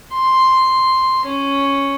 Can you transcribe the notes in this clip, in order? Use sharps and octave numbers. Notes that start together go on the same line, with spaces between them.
C6
C#4